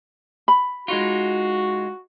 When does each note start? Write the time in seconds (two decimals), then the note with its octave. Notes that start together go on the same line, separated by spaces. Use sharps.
0.48 B5
0.88 G#3 D#4 F4 F#4